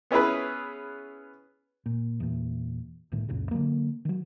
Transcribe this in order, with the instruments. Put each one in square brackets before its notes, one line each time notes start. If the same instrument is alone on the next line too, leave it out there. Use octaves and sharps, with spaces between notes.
[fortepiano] B3 C#4 E4 G#4 B4
[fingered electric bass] A#2
E2 A#2
C2 A2 D#3
C#2 F#2 A#2 C#3
D3 F#3 A#3
D#3 F#3